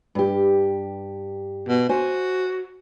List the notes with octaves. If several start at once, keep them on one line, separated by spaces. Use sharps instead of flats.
G2 G4
B2
F#4 C5 G#5